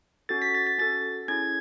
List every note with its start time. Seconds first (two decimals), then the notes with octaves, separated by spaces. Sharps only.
0.29 C#4 F#4 A4 A6
0.42 B6
0.55 A6
0.67 A6
0.78 C#4 F#4 A4 A6
1.28 C#4 E4 G#4 G#6